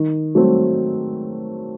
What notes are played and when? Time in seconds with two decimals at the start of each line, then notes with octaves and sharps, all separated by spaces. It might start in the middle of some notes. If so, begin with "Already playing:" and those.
Already playing: D#3
0.35 F#3 A3 C4